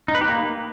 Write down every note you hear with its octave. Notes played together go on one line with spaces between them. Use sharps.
D#4
B4
G4
A#3